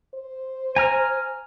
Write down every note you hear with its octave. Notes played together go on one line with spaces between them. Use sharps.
C5
G#5 A#5 F6